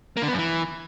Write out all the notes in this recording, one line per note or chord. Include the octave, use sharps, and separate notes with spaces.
A#3
D3
B3
F#2
E3